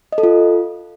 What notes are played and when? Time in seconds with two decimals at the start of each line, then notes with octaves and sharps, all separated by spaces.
0.12 D#5
0.18 A4
0.23 F4